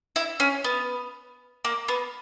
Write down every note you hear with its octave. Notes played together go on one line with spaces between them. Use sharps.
E4
C#4
B3
A#3
B3